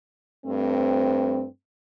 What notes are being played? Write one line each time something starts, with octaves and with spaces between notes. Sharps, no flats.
G2 A3 C4